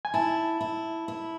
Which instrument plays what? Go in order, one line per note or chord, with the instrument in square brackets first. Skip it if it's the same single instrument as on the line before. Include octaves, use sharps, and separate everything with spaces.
[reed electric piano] G#5
[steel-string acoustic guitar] E4 [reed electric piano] A5
[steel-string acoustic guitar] E4
E4